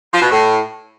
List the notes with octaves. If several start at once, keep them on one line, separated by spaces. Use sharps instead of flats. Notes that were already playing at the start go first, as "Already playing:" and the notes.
F3
B2
A2